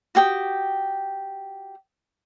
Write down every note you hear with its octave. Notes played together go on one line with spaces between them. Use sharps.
F#4 G4 G5 D#6